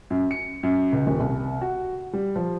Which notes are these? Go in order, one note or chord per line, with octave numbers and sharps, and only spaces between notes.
F#2
C#7
F#2
C#2
D#1
C2
F#4
G3
F3